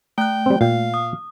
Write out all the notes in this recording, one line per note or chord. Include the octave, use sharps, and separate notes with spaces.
A3 G5 F#6
G3 C4
A#2 F5 G5
D#6